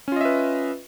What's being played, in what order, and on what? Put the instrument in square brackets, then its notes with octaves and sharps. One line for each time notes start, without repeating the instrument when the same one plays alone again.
[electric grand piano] C#4
F4
D#5
E5
B4